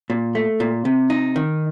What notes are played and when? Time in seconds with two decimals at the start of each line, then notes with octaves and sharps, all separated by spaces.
0.10 A#2
0.35 A3
0.60 A#2
0.85 C3
1.10 D#4
1.36 D#3